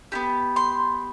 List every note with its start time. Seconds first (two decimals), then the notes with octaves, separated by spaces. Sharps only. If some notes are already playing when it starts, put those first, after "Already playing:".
0.12 B3 E4 G4
0.56 C6